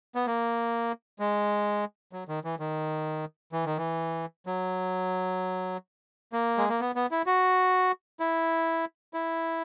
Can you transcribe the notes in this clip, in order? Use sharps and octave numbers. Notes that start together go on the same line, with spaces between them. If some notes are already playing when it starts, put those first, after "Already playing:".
B3
A#3
G#3
F#3
D#3
E3
D#3
E3
D#3
E3
F#3
A#3
G#3
A#3
B3
B3
E4
F#4
E4
E4